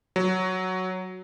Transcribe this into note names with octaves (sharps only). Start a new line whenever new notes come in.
F#3